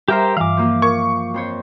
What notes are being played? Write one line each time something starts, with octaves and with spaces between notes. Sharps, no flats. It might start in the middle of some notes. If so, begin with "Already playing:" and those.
G3 G4 A#4 C5 E5 A#5 F6
G2 E3 F5 D6
F3 A#3 F4
A#4 C#6
F2 C5 C#5